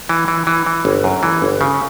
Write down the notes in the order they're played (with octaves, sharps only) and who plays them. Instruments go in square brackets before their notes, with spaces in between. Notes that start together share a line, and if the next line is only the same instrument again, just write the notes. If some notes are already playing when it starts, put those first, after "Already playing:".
[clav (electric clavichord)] E3
E3
E3
E3
G1
F#2
E3
G1
C#3